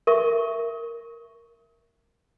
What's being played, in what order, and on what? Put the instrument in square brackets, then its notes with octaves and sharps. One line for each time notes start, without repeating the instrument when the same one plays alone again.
[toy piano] A#4 E5 C#6